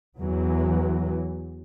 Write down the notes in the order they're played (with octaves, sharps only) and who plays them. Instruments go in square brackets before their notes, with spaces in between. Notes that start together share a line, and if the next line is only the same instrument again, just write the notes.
[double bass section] E2 E3 F#3